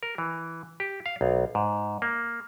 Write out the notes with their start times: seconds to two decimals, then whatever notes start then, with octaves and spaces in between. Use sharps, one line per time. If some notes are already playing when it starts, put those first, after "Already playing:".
0.03 A#4
0.18 E3
0.80 G4
1.06 F5
1.21 B1
1.55 G#2
2.02 A#3